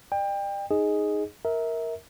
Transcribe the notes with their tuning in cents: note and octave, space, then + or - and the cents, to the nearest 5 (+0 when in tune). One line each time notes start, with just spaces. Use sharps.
D5 +40 G5 +25
D#4 +0 G#4 +0 D#5 +0
A#4 +0 E5 -30